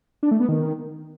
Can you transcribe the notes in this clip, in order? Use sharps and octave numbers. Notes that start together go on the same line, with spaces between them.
D4
A3
B3
D#3